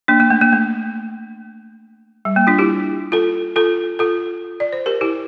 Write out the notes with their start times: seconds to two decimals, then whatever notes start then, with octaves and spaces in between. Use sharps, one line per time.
0.08 A#3 D4
0.20 A#3
0.30 A3
0.41 A#3
0.52 A3
2.25 G3
2.36 A#3
2.47 D4 F4
2.59 E4 G4
3.12 F4 A4
3.56 F4 A4
3.99 F4 A4
4.60 D5
4.73 C5
4.86 G4 A#4
5.01 E4 G4